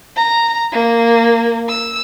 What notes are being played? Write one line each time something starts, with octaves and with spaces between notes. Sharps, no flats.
A#5
A#3
E6